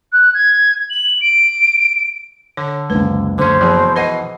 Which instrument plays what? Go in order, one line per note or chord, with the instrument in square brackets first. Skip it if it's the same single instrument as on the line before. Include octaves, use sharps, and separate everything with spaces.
[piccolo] F#6
G#6
F#7
D7
[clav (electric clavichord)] D3 [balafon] C#5
[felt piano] F#1 C#2 [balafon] B4
[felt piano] F#1 [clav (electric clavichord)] D3 C#4 [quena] C5
[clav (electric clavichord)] B2 E3 [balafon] F3 G#4
[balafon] B4 D#5 F#5 [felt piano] A#6 C7